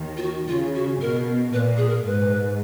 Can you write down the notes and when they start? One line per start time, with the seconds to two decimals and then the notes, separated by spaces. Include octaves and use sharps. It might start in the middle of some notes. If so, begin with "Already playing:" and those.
Already playing: D#2 D#3
0.17 F4
0.22 F#4
0.48 C#3 F4
0.75 F#4
1.01 B2 A#4
1.53 A#2 B4
1.77 G#4
1.89 A#4
2.06 G#2 B4